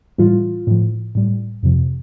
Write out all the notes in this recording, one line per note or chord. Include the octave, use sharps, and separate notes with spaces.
A2 E3 G3 F4
A2 F3
A2 G3
F2 C3 F3